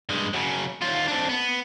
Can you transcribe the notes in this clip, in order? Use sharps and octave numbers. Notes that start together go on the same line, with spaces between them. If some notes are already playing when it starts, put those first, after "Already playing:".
G2 G#3
F#2 C#3
D#2 F4
F2 D4
B3